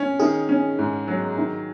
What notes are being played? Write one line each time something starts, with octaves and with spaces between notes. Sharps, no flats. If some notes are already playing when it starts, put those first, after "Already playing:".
Already playing: C#4
D#3 G#4
C#4
G#2
F#3
D#3